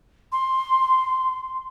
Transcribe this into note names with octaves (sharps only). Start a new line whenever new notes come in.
C6